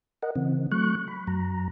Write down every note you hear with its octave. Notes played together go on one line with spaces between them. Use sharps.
A#4 D#5 F#5
C#3 E3 C4
F#3 A3 C#6 F#6
B5
F#2 F#3 A#5